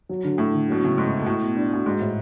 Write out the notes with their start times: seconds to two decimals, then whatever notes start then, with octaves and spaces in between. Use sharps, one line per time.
0.09 F#3
0.24 D3
0.38 A2 A3
0.54 D3
0.68 B2 F#3
0.83 A2 C#3
0.98 G#2 A3
1.12 E4
1.22 B2
1.26 A2 A3
1.41 B2
1.57 D4
1.72 A2 F#4
1.86 G#2 G#3
2.00 A2